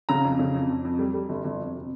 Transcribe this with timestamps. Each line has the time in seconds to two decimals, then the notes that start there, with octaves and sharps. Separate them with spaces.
0.09 C#3 A#5
0.25 F2
0.39 C#3
0.55 F2
0.70 F2
0.85 F2
0.99 G3
1.14 G3
1.29 G1
1.44 G1
1.60 F2
1.75 C3